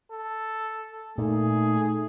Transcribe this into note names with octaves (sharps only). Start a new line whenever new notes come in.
A4
A#2 A3 D#4 G#4